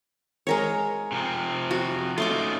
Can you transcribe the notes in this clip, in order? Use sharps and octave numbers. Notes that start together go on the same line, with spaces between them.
G#3 A#4 C#5
C3 F3 C4
F#4
A3 C#4 D#4 F4 C6 D6